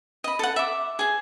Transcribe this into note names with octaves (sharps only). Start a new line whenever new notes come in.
D#5 B5
A4 F#5
E5 D6
G#4 G#5